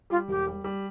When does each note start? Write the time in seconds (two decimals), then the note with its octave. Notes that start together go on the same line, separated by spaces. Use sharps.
0.10 G3 F4
0.28 E1 G4
0.47 G3
0.64 G3